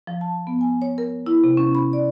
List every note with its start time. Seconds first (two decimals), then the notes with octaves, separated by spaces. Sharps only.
0.07 F3
0.21 A5
0.47 B3
0.61 G#5
0.82 C#5
0.98 A#4
1.26 E4
1.44 C3
1.57 C#4
1.75 B5
1.93 D5